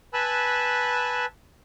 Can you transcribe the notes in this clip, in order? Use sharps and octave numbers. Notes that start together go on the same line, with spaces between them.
B4 G#5 A5 B5 E6 F#6